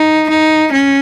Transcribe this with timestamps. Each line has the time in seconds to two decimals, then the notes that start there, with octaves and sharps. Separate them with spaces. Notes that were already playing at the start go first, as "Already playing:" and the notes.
Already playing: D#4
0.29 D#4
0.72 C#4